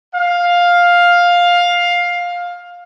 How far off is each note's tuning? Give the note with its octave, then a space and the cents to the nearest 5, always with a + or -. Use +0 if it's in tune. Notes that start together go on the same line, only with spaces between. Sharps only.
F5 +10